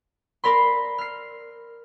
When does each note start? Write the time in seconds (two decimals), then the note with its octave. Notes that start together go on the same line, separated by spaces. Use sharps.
0.44 A#4 C5 D5 B5 C6
0.98 F6 C7